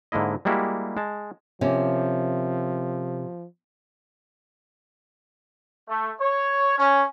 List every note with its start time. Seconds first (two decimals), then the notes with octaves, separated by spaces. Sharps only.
0.12 G#2 D3 A#3 E4 D#5
0.45 G3 G#3 A#3 E4 F#4 G4
0.97 G#3 A5
1.61 C3 F3 A#3 C#4
5.89 A3
6.20 C#5
6.77 C#4